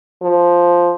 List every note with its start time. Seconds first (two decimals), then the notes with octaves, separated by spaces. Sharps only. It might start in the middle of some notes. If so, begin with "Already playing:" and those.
0.22 F3